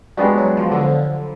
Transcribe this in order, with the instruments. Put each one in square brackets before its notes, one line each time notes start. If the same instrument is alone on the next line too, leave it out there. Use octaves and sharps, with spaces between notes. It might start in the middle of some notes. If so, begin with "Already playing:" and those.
[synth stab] G3 [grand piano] G#3 B3 D4 F#4
[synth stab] F#3
F3
D3